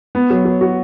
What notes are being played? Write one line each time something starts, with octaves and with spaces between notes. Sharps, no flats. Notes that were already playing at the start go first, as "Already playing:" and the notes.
B3
F#3
F#3
F#4